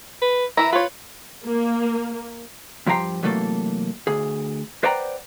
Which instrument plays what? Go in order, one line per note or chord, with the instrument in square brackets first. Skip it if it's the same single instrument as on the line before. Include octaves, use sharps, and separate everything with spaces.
[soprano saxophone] B4
[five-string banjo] E3 E4 [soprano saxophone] A#5
[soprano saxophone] F4 [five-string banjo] B4 C#5
[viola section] A#3
[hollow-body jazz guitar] G2 F3 G4 G5 A#5 C6
C3 E3 F#3 A3 A#3 A4
D2 G#4
B4 C5 D5 F#5 G5 A#5